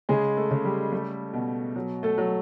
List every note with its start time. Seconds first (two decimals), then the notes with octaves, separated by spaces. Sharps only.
0.09 C#3 G#3 G#4
0.37 A3 A4
0.51 C#3
0.64 G3 G4
0.92 G3 A3 A4
1.33 B2
1.76 F#3
2.03 A3 A4
2.18 F#3